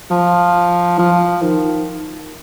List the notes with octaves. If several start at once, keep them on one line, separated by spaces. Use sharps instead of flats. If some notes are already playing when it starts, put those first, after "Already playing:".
F3
F3
D#3